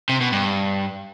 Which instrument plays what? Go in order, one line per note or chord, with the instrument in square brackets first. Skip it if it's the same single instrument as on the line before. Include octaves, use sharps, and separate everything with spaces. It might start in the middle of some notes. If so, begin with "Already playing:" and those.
[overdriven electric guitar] C3
B2
G2